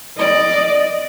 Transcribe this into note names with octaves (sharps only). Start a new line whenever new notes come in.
D5 D#5